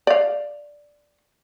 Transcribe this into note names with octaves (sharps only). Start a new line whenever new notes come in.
D5 F5